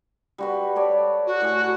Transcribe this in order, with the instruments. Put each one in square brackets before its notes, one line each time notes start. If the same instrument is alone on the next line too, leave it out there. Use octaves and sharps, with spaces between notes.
[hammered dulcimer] G3 F#4 B4
A4 C#5 D5
[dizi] F#4
[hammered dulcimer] A2 G#5